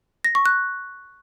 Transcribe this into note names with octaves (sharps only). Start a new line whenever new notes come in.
A#6
C#6
F#6